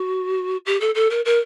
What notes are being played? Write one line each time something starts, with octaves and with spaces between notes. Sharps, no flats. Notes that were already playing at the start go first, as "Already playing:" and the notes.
Already playing: F#4
G4
A4
A4
A#4
A#4